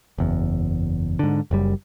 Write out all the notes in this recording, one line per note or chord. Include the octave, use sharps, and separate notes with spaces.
F#1 E2
G#2 D3
F#1 F#2 G3